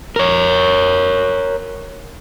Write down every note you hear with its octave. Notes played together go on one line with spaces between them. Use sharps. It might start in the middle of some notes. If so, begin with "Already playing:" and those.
A#4 C#5